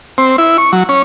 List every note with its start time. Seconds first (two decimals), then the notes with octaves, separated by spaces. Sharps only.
0.18 C4
0.38 E4
0.58 C#6
0.73 F#3
0.89 C#4